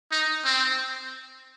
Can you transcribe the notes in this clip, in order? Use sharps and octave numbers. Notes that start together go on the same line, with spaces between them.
D#4
C4